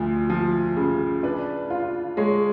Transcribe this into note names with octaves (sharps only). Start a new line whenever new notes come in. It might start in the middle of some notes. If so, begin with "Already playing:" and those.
Already playing: D2 F3
F3
C#3
D4 B4
F4
G#3 C#5